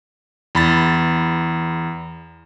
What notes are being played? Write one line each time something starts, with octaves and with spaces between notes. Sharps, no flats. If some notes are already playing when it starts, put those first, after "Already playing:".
E2 B5 A6